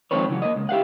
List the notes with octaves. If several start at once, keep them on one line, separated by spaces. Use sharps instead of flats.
D#3 F3 G#3 C4 B4 C#5
C#3 E3 F#3 B3
A#3 D#5
C#2
E4 G4 F5 F#5